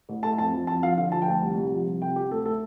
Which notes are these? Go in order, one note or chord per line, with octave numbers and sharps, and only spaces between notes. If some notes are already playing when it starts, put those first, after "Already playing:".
A1
A3 A5
F2 A5
F3
F2 A5
F3 F5
D3 F5
F3 A5
G5
D2 A5
C2
C2
F3
C2
C3 G5
C3 G4
D2 A4
A3 A4